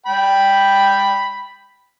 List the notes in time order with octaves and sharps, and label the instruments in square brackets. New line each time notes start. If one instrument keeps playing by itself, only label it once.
[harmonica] G5 B5